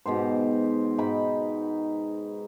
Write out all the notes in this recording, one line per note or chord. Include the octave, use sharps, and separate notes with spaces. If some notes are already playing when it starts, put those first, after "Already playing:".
G#2 B2 G4 C5
G#2 D#4 G5 B5